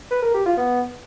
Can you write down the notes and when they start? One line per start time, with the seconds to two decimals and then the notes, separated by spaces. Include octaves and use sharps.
0.11 B4
0.23 A#4
0.34 G4
0.46 F4
0.57 B3